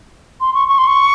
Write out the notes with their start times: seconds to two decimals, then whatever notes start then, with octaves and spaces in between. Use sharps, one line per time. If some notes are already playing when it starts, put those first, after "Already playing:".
0.41 C6
0.54 C#6
0.69 C#6
0.78 C6
0.87 C#6